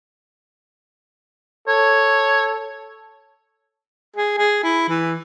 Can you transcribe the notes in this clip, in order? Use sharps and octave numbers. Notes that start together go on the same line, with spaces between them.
A4 C#5
G#4
G#4
E4
E3